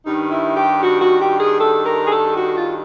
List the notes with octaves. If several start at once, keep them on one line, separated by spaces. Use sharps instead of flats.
G2 D#3 D#4
E4
G4
F#4
F#4
G4
G#4
A4
A#4
G#4
A4
F#4
F4